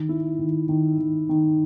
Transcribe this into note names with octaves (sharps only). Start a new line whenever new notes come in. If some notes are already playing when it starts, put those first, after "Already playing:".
Already playing: D#3
E4
D#3
D#3
D#3
D#3